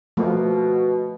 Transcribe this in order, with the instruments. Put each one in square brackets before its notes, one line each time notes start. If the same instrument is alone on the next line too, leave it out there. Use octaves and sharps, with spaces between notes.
[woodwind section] B2 [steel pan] F3 A3 A#3